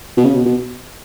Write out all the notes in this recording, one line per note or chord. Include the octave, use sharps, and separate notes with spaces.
B2
C#3
B2
B2